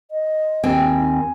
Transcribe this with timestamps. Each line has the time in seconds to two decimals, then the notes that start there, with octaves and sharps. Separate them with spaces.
0.11 D#5
0.64 D#2 C4 G5 G#5
0.97 D#4